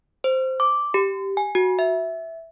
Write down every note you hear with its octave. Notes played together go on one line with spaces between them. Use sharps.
C5
D6
G4
G#5
F#4
E5